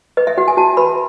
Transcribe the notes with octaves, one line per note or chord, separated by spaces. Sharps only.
B4 D#5
E5
F#4 F#5
G#5
F#4 A5
B4 B5